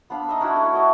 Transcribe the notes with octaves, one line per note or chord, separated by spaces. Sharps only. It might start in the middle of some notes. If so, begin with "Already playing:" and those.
B3 D4 F5 B5
D#4 D#5 E5
C#4 D4 E4 F#4
A3 C#4
F#4 D#5 E5